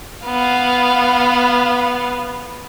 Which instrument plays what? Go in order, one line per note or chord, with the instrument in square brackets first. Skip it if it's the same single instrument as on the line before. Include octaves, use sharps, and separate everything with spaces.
[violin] B3 F5